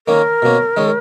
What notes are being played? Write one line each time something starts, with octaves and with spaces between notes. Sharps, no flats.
D#3 A#3 C#4 A#4
B2 A#3 C#4
D#3 G#3 C#4